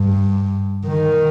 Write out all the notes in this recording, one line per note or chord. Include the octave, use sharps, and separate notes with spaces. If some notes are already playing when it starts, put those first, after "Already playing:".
Already playing: G2
D#3